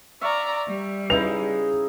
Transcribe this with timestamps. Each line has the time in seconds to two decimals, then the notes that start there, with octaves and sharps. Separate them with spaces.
0.21 D5 E5 F5 A#5 C#6
0.67 G3
1.10 C#3 G#3 D#4 E4 B4 F7